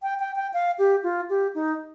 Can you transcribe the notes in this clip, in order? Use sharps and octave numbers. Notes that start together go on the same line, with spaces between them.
G5
G5
G5
F5
G4
F4
G4
D#4